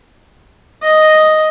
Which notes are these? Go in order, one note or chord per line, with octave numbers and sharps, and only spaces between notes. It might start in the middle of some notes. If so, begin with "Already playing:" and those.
D#5